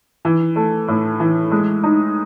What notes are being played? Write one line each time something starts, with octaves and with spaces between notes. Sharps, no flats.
E3
A3
A2
E3
G#3
D#4